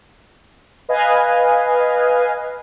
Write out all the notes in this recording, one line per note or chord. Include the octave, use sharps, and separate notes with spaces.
B4 D#5 F5 G#5